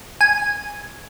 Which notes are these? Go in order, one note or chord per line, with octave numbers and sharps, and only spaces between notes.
G#5